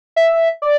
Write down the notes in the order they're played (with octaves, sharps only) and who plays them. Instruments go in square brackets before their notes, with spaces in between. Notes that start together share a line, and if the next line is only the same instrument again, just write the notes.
[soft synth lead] E5
D5